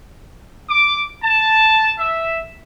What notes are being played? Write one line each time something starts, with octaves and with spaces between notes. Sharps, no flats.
D6
A5
E5